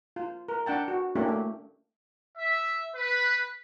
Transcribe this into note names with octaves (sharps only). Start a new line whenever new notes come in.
F4
A#4
D4 F#5 G5 A5
F#4
A#3 C#4 D4 E4 G4 A4
A3
E5
B4